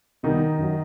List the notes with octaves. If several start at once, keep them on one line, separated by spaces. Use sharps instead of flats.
C2 B2 D#3 G3 D#4
F#2 F#3